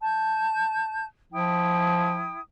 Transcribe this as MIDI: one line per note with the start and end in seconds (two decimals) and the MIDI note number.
0.01 1.04 81
0.01 1.04 91
1.32 2.34 53
1.32 2.38 64
1.32 2.38 79
1.32 2.38 87